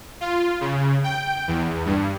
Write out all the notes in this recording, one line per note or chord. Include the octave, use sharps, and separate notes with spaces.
F4
C#3
G5
E2
G2